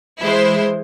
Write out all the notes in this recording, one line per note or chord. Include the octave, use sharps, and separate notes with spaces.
E3 G#3 E4 C5